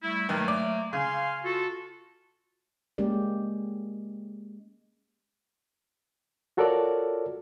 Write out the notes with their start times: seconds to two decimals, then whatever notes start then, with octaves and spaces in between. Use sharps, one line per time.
0.03 G3 A3 E4
0.29 G2 D#3 F#3 A3 A#3
0.48 D5
0.93 C#3 F5 G#5 C6
1.44 F4 F#4 A4
2.98 G#3 A#3 C#4 G4 A#4 D5
6.57 F4 F#4 A4 A#4 C#5 D5